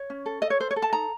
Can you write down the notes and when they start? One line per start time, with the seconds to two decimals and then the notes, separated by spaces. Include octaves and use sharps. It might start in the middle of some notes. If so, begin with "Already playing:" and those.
Already playing: C#5
0.10 C#4
0.26 A4
0.42 A4 D#5
0.50 C#5
0.60 A4 C5
0.71 C#5
0.76 A4
0.82 A5
0.93 D#4 A#5